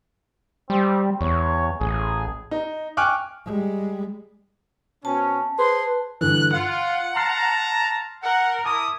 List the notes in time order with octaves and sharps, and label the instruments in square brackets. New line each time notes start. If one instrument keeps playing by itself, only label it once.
[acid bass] G3 [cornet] C4
[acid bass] E2 [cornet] C#5
[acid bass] A1 [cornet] G#4
[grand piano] D#4
G5 G#5 C#6 D6 F6 F#6
[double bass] G3 G#3
[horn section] B2 C4 C#4 [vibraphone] A5
[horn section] G#4 C5 C6 [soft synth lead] B4
[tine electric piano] G2 D3 E3 [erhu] F#6
[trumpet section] F4 [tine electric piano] F5 [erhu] F#5
[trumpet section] A5 A#5 [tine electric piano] C6 F6 C7
[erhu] A#4 [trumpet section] F#5
[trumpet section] E4 D#6 [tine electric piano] A5 D6